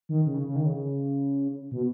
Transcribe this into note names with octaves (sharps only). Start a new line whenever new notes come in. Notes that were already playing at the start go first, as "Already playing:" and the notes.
D#3
C#3
C#3
D#3
C#3
B2